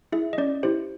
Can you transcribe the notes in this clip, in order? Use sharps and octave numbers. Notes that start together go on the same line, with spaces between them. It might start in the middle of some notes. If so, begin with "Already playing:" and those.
E4 G#4 E5
D#5
C#4 D5
E4 G4 C5